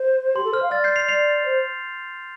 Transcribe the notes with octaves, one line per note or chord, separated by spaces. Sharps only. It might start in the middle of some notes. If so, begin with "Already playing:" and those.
Already playing: C5
G4 C6
A4
C5 F6
F5
D5 F6 A6
G6 C7
C7 F7
D5 C7 F7
C5